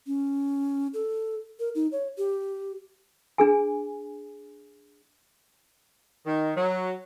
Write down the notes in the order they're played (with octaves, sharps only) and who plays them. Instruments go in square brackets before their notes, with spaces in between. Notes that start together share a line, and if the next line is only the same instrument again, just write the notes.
[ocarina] C#4
A4
A#4
D#4
C#5
G4
[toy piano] D4 G#4 G#5
[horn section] D#3
F#3